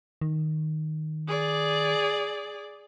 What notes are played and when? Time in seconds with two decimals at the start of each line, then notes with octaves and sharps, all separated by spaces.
0.21 D#3
1.28 G#4 D5